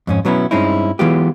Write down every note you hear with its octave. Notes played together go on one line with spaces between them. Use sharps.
F2 G#2 C#4
B2 F#3 B3 C#4 E4
G2 G#3 C4 C#4 D#4 E4
E3 F#3 G#3 B3 F4 G4